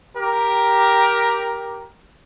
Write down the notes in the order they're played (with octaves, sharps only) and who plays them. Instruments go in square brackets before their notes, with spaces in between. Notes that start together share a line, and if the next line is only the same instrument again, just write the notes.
[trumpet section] G4 A#4